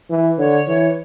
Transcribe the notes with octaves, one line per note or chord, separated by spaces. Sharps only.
E3
D3 C#5
E3